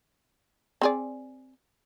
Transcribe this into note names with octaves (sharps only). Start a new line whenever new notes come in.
C4 G#4 D5